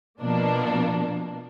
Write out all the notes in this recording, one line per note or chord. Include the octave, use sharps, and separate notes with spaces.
B2 F3 A#3 D4